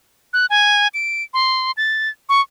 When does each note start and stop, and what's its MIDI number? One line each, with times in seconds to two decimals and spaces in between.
0.33 0.46 90
0.50 0.88 80
0.94 1.23 98
1.34 1.71 84
1.77 2.09 93
2.29 2.41 85